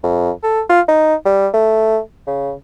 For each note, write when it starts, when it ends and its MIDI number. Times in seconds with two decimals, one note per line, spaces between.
0.03 0.31 41
0.43 0.61 69
0.69 0.81 65
0.88 1.15 63
1.25 1.47 55
1.54 1.99 57
2.27 2.53 49